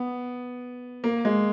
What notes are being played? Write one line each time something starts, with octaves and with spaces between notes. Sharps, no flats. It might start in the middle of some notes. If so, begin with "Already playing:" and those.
Already playing: B3
A#3
G#3